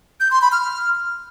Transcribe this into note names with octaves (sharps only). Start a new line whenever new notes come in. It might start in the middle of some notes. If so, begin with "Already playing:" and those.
G6
C6
B5
F6